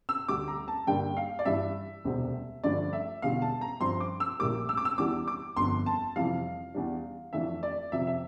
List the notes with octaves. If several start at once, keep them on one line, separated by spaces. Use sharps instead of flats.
E6
D2 D3 G3 D6
A#5
A5
G2 D3 G3 A#3 D4 G5
F5
D5
G2 E3 G3 D4 E5
E1 D2 C3 G3 C4
G2 D3 F3 A3 D4 D5
E5
E1 E2 D3 G3 F5
A5
A#5
G2 F3 C4 C6
D6
E6
A#1 A2 G3 A#3 D6
E6
D6
E6
E2 E3 G3 D4 D6
D6
G1 F2 D3 C6
A5
F2 C3 E3 G3 F5
E2 E3 G3 D4
F2 E3 A3 D4 E5
D5
F2 C3 F3 E5
E5